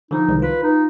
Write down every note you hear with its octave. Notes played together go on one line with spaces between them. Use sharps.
D3 F3 D#4
C2 D#3 G#3
F4 B4
D#4